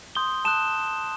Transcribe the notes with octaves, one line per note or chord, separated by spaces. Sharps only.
C6 D#6 G6 G7
A5 D#6 F#6 E7